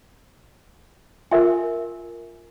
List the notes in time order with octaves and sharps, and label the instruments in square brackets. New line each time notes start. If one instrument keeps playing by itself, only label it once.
[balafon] F4 [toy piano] A#4 E5 G#5